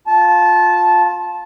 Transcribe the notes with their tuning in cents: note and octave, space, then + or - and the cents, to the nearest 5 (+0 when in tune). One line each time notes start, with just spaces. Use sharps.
F4 +20 A5 -15